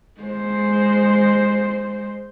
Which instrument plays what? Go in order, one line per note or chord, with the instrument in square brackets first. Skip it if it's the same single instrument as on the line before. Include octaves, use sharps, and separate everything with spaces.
[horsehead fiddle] G#3 C5